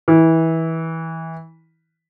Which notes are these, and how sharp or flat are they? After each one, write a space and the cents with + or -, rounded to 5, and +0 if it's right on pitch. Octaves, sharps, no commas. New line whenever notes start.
E3 -20